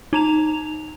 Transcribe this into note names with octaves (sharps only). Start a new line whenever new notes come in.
D#4 A#5 F7